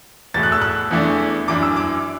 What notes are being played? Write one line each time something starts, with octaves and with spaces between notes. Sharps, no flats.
E2 B2 A3 A6
F#6
E6
F#6
E2 E3 A3 D4
F#2 E3 D4 D6
E6
D6